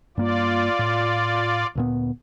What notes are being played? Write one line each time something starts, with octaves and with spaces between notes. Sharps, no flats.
G2 A#3 F4 D5
A2
D2 A#2 B3